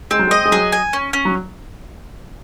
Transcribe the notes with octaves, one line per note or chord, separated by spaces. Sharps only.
G#3 C4
F#3
G#3
D#5
G#3
F#3 G#4
G#5
C#4
C#4
F#3